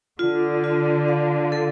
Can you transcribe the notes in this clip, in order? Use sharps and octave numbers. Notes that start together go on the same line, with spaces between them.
D3 F4
F4
F5
A4